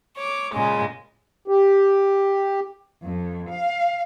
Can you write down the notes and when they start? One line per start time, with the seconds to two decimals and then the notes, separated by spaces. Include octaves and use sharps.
0.16 C#5 D6
0.53 A#2 C#3 G#3
1.48 G4
3.03 F2
3.49 F5